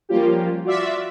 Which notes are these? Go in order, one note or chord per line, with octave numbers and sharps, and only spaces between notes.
F3 G3 A#3 C#4 F4 G4
F4 F#4 D5 E5